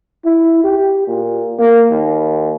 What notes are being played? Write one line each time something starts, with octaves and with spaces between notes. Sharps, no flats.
E4
G4
A#2
A#3
D#2